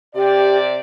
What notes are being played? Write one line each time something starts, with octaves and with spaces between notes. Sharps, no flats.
C3 G4 D5